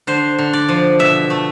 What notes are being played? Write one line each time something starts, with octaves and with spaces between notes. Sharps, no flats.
D3 C5
D3
D5
F3
B2 E5
A3